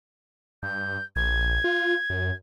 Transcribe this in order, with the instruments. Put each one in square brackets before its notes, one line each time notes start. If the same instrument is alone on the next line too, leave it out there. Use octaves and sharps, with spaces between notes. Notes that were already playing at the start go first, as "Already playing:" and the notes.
[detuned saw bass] G2 [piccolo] G6
[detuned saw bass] A#1 [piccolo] G#6
[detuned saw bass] F4
F#2